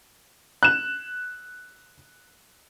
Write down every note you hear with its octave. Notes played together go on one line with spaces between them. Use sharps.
F#6 E7